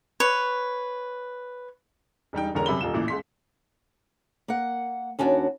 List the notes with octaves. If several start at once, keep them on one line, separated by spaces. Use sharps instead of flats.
B4 C#5
E1 G3 D#4 G5
E1 E2 D3 C#4 A#4 A#5
F#2 C3 B5 G7
D#1 F4 E7
A1 A#2 E3
C#2 C6 B6
A#3 F#5
D#2 C#4 D4 F#4